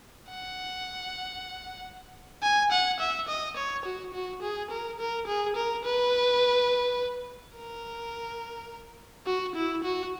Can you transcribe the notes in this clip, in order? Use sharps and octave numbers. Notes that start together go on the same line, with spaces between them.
F#5
G#5
F#5
E5
D#5
C#5
F#4
F#4
G#4
A#4
A#4
G#4
A#4
B4
A#4
F#4
E4
F#4